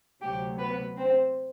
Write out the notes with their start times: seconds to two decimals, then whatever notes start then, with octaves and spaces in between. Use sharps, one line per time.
0.21 D2 C3 F#3 A3 G4
0.59 B3 B4
0.96 C4 C5